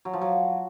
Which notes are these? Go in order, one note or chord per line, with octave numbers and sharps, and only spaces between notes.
F#3
F3
F#3